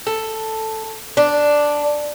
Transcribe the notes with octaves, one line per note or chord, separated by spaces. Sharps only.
A4
D4